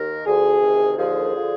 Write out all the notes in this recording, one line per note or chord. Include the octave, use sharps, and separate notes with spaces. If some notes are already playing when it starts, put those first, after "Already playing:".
Already playing: D#2 D#3 A#4
D2 D3 F3 G#4
D2 C3 D#3
D#2 D3 F3 G#4
D3 F3